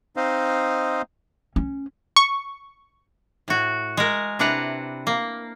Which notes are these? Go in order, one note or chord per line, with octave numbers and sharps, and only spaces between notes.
C4 D#4 C5 D#5 F5
C#4
C#6
A2 F#4
G#3 A#4
C3 D4 E4 B4 F#5 A#5
A#3